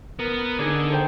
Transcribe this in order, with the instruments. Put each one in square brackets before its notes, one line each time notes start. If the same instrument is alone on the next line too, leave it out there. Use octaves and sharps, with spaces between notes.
[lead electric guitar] B3 [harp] A#4
[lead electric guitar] D3 [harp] D#4 G#4 D5
[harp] A4 C5 G5